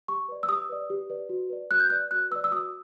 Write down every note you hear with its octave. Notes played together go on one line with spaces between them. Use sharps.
G4 C#6
B4 D5
E6
G4 D#6
B4 D5
G4
B4 D5
F#4
B4 D5
F#4 F#6
G6
B4 D5 F#6
F#4 F#6
B4 D5 E6
E6
F#4 D#6